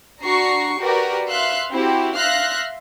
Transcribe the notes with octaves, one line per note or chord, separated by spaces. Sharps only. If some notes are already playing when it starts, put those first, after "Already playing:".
D4 F#4 A#5 C#6 C7
F#4 G4 A#4 B4 D5
E5 F5 C6 F#6
C4 E4 F#4 G4
E5 F5 C6 F6 F#6 A#6